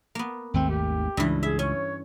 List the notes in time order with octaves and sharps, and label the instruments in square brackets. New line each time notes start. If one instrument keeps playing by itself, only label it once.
[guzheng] A#3 B3
[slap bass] G#1 D#2 A3 [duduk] C4
[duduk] G4
[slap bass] C#2 [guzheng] G2 E3
[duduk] G#4 [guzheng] E5
[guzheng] C#4 [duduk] C#5